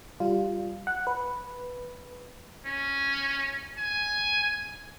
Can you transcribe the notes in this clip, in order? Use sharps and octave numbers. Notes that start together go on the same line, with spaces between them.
G3 F4
F#5
B4
C#4
G#5